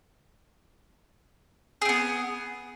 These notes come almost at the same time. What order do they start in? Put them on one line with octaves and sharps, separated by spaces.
G#4 C4 B3